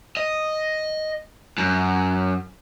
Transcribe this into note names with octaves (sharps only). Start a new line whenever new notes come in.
D#5
F#2